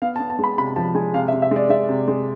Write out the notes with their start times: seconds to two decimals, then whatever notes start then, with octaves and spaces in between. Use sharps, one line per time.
0.02 B3 F5
0.16 A5
0.20 B3
0.30 A5
0.39 G#3 B5
0.58 C3 B5
0.76 F3 A5
0.95 G#3 G#5
1.14 C3 F5
1.28 E5
1.33 C3
1.42 E5
1.51 G#3 D5
1.70 G#3 E5
1.89 C3
2.08 G#3